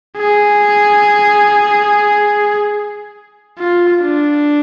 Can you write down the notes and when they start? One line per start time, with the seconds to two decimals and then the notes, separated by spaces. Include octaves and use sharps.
0.17 G#4
3.59 F4
4.01 D4